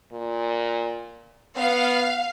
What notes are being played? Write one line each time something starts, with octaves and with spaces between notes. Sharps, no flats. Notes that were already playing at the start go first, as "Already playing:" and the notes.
A#2
B3 F5